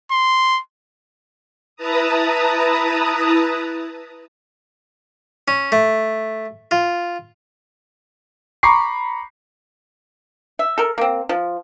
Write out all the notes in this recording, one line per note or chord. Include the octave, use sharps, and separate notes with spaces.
C6
E4 B4 A5 A#5 D#6
C#4
A3
F4
A#5 B5 C#6 D6 C7
E5
A4 A#4
A#3 C4
F3